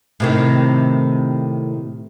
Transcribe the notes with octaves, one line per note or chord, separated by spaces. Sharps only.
A2 C3 D#3